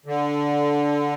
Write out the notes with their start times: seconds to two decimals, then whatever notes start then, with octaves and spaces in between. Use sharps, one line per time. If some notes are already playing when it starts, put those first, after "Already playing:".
0.06 D3